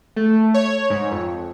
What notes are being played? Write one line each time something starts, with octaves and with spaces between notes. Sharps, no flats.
A3
C#5
G#2
F2